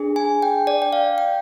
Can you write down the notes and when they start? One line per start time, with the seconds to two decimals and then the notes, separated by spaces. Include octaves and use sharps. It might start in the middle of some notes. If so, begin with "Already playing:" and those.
Already playing: D4 G#4
0.16 G#5
0.42 G5
0.67 D5
0.82 G5
0.92 F5
1.18 G5